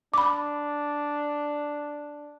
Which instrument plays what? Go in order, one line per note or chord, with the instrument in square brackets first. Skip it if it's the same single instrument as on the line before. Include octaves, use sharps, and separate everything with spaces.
[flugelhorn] D4 [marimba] B5 D6